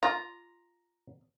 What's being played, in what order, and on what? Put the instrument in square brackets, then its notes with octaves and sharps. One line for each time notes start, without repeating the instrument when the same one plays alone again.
[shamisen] F4 [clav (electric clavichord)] A#5